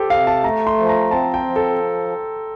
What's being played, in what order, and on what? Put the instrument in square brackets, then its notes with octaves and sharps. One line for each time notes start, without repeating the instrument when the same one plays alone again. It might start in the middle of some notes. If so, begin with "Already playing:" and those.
Already playing: [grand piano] G4 A4 C5
[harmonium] C3 [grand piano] F5
[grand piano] A5
[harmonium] A3 [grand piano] A#5
[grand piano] C6
[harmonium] F3
[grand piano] A#5
[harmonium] C4 [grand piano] A5
[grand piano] G5
[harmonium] F3
[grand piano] A4